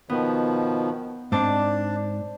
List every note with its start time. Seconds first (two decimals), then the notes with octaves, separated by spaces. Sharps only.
0.09 B2 D#3 F3 B3
1.32 G#2 C4 D4 C5 D5 A5